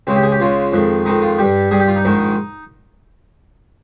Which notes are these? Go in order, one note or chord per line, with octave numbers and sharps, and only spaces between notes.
C#2 C#3 G#3 C4
G4
G#4
G4
C#2 C#3 G#3 F4
F2 D#3 G#3
F2 D#3 G#3 D#4
F4
G2 G3 G4
G2 G3 G#4
G4
F4
D#4
A#1 G#2 D#3 G#3